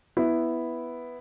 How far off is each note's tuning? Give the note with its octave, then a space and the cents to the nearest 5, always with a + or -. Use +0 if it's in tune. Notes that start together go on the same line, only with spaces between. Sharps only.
B3 +0 E4 +0